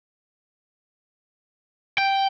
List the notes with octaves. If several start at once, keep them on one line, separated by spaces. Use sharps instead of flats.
G5